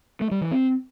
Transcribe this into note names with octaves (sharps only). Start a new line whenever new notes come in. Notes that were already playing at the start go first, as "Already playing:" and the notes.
A3
G3
E3
C4